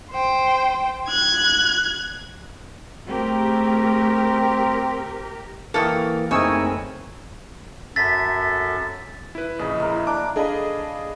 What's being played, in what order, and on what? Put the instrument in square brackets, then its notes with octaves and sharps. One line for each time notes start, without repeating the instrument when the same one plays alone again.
[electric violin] C5 G5
F#6 G#6
[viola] A3 G#4 [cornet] C4 [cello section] G4 A#4
[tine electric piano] E3 A#3 [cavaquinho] A4 D#6 [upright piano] G5 C#6 F6
[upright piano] F#1 C4 D#6 [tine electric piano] A3 D#4 E6 [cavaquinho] C#5 [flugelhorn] G#5
[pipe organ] F#2 A4 E5 [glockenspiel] A6 B6
[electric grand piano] E4 B4
[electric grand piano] A#1 C#3 [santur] D#5 G#5 B5
[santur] E4 A#4
[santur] A#3 D4 [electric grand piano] D6
[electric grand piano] D4 G#4 D#5 [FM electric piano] A4 F5 B5